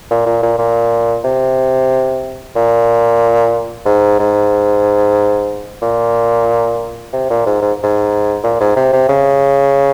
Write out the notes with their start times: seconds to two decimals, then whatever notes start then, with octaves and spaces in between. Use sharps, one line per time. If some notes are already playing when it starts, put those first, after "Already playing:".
0.11 A#2
0.26 A#2
0.43 A#2
0.59 A#2
1.24 C3
2.56 A#2
3.86 G#2
4.19 G#2
5.82 A#2
7.13 C3
7.30 A#2
7.46 G#2
7.62 G#2
7.84 G#2
8.44 A#2
8.61 G#2
8.77 C3
8.93 C3
9.09 C#3